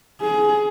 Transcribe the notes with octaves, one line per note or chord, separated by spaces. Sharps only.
G#4